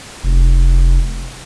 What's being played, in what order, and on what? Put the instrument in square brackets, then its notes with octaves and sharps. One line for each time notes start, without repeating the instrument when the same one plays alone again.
[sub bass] F1